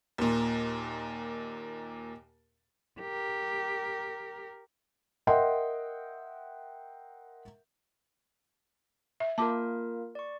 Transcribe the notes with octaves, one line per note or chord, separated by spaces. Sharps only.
D#2 A#2
G4 A#4
A#4 D#5 E5 F#5 G5 C6
E5
A#3 F4 A#4 A5 D6
D5 C#6